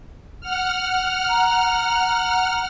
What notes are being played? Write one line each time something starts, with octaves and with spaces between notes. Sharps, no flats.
F#5 F6
A#5